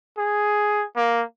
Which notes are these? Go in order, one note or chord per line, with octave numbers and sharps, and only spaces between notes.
G#4
A#3